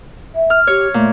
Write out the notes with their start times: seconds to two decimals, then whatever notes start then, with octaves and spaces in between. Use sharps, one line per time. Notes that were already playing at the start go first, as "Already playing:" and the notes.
0.34 E5
0.50 F6
0.67 G4 C#5
0.94 A#2 A3